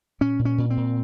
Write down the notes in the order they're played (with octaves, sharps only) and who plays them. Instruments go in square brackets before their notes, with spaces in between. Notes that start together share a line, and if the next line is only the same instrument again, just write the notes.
[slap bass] A#2 C#4
A#2
C#4
A#2
C4
A#2